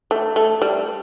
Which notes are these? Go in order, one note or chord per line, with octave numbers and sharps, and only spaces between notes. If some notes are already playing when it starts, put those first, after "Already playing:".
A3
A3
G3